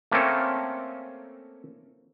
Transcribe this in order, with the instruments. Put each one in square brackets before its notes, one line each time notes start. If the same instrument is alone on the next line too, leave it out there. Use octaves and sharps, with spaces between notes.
[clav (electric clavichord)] A3 A#3 C4 C#4 A4